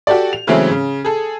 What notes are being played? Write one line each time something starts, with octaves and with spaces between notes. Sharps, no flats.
F#4 G4 A4 D5
F7
C#3 E3 F#3 G#3 A3 C4
C#3
G#4 A4